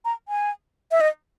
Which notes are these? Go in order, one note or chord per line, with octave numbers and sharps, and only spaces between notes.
A#5
G#5
E5
D#5